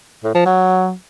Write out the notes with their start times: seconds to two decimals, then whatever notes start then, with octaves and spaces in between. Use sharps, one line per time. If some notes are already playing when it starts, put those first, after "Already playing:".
0.24 A2
0.35 F3
0.46 F#3